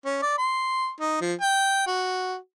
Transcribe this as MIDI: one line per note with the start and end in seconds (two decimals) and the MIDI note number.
0.05 0.22 61
0.22 0.36 74
0.38 0.91 84
1.00 1.17 63
1.21 1.33 53
1.41 1.87 79
1.87 2.36 66